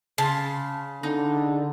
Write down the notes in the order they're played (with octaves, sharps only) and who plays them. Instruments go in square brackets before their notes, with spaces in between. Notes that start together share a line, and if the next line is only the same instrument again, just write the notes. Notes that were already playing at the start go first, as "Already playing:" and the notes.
[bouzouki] C#3 [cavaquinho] A5 C6
[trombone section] D3 [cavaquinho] D#4